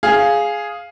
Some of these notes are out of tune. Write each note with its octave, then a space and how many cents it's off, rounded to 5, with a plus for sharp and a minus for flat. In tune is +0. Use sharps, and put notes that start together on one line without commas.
G#4 +0 F5 +0